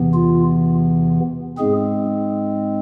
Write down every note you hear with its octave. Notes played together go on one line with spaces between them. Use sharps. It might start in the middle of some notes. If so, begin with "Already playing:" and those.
Already playing: E2 C3 E3 B3
F4
G#2 G#3 C4 G#4